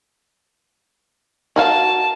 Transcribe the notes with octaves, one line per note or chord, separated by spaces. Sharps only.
F#4 A#4 F5 A5